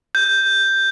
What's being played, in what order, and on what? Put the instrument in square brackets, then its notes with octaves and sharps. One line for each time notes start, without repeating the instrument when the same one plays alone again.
[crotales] G6